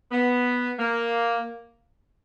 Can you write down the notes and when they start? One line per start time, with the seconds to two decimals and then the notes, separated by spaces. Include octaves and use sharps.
0.12 B3
0.79 A#3